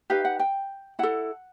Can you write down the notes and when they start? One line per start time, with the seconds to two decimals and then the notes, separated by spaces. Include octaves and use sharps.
0.10 D#4 G4 B4 F5
0.25 F#5
0.39 G5
0.99 E4 A4 F#5